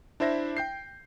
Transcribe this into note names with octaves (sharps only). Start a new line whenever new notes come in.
D4 E4 C5 E5 A#6
G5 G6 C7